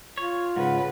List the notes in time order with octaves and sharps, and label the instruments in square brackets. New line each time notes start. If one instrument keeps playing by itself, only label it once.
[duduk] F4 [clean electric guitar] C#5
[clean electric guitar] G#2 [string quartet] C#3 B4 [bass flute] F#5